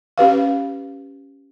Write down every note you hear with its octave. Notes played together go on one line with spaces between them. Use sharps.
C#4 G4 B4 F5